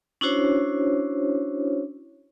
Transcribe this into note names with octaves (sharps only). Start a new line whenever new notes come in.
C#4 D4 E4 F#4 C5 C#5